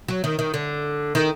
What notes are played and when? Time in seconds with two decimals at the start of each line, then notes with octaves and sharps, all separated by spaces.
0.08 F#3
0.24 D#3
0.39 D#3
0.54 D3
1.15 D#3